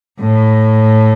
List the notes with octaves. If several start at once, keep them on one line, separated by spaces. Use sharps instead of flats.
A2